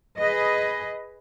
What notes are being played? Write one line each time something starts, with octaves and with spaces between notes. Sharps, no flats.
G#4 B4 D#5